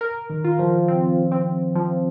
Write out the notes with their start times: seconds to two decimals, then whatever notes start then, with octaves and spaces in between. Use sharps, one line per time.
0.01 A#4
0.30 D#3
0.44 F4
0.59 F3
0.88 C4
1.32 C4
1.76 F3